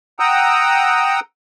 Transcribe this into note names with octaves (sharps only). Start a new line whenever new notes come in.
F#5 G5 A#5 D#6 E6